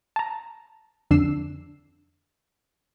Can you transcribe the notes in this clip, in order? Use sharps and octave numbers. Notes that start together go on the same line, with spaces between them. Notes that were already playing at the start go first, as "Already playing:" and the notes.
A5 A#5
F2 D3 D4 E6 C7 E7